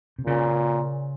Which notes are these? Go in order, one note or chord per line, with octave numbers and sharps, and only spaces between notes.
C3
A#2 C#3